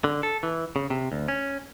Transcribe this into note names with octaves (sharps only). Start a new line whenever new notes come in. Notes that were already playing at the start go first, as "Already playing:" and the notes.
D3
A4
E3
C#3
C3
D2
C#4